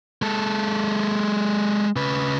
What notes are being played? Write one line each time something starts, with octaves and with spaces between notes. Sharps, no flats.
G#3 A4
C#3 B4